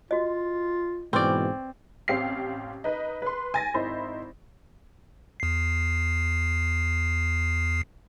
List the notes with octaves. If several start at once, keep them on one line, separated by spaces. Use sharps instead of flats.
F4 F#4 D#5
G#2 B2 E3 C4 B4 D5 C6 C#6
A1 C4 G4 F5 C7
D#4 B4 D#5
B4 C6
G#5 A6 A#6
G#1 D#4 E4 C5 B5
E2 C7